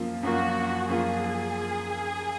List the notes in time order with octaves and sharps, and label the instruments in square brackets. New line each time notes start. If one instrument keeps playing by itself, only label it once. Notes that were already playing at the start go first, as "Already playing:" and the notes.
Already playing: [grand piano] F#2 F3 A#3 F4
[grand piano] F#2 F3 A#3 F4 [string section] F#4
[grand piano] F#2 F3 A#3 F4 [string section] G#4